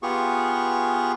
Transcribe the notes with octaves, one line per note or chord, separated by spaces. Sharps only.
B3 F4 G4 G#4 C#6